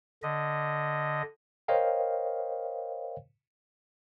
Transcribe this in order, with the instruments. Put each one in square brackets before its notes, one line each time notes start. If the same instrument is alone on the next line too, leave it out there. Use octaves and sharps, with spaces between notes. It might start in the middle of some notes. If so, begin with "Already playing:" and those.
[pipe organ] D3 D#5
[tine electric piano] A#4 C5 C#5 D#5 F5 G5